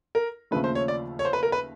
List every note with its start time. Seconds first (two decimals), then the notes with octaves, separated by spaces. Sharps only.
0.15 A#4
0.51 D#2 C#3 F3 A3 B4
0.64 C5
0.75 C#5
0.88 D5
1.19 C#5
1.25 C5
1.33 B4
1.43 A#4
1.52 B4